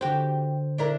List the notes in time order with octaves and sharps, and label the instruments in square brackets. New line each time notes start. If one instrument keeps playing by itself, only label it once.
[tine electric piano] D3 C5 [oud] F#4 G4
[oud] D4 E4 A#4